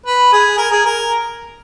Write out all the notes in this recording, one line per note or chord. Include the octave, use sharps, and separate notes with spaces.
B4
G#4
A#4
G#4
A#4